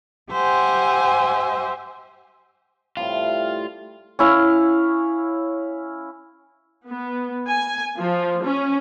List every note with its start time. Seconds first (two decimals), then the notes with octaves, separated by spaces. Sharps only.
0.31 G4 C5 E5 F#5 G#5
2.97 A2 C3 G3 F4
4.19 C#4 E4 F5
6.86 B3
7.50 G#5
7.96 F3
8.42 C#4